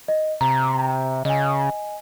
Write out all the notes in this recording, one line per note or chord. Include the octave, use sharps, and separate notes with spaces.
D#5
C3 A#5
C#3 D#5 G#5